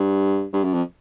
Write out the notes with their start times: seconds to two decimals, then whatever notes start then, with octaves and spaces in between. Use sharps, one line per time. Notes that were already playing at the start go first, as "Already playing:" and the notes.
Already playing: G2
0.53 G2
0.63 F#2
0.73 F2